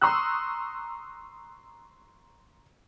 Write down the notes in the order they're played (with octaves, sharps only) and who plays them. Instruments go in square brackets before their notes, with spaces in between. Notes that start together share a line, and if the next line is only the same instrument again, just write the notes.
[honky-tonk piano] A#5 C6 C#6 D#6 E6 F#6